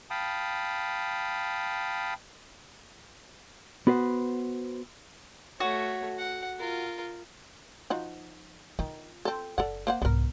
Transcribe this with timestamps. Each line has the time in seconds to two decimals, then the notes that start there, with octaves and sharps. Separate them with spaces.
0.10 F5 G5 A5 B5 D#6
3.87 B3 F#4 B4 C5
5.60 A3 F#4 C#5
6.18 F#5
6.59 F4 A#4
7.90 F3 D#4 F#4
8.79 D#3 F4
9.25 C4 A4
9.58 F#1 A4 D5 F#5
9.87 A#3 C5 F#5
10.02 C2 G#2 B3 A#4